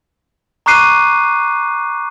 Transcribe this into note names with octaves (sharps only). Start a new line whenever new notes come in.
A#5 C#6 D6 F#6 C7 D#7